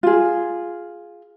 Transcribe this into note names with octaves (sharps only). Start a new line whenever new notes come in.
F4 G#4